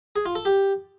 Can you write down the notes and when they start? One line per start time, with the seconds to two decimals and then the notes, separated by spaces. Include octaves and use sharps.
0.16 G#4
0.26 F4
0.35 A4
0.45 G4